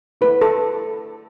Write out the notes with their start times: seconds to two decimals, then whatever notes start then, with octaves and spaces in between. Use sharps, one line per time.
0.21 A3 E4 B4
0.41 A4